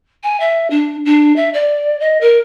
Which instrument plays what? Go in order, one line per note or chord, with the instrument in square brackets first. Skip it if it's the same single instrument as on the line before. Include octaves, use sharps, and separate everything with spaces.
[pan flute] G#5
E5
D4
D4
E5
D5
D#5
A#4